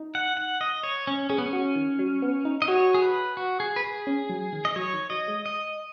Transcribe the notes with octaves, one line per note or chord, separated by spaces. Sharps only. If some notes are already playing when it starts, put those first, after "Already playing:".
Already playing: D#4
F#5
F#5
D#5
C#5
C#4
C#4 G#4
B3
C#4
F#4
D#3
F#3
B3
D#4
D#5
F#4 C#5
G#4
B4
F#4
G#4
B4
G#4
C#4
F#3
D#3
D#5
F#3 C#5
D#3
F#3 D#5
G#3
D#5